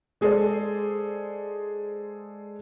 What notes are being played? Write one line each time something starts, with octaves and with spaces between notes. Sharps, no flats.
G#3 G#4 A4 C5 D5